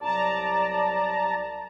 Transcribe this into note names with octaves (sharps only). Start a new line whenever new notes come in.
C2 F#3 D5 A5 A#5